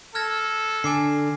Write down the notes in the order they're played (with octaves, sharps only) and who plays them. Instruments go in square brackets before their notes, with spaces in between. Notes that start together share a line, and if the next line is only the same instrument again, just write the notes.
[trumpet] A4 [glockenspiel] F6 G#6 A#6
[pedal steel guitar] D3 [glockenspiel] G#5 D6 C7